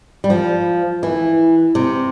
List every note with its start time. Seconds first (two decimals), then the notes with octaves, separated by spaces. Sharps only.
0.24 G3
0.30 F3
1.03 E3
1.75 C3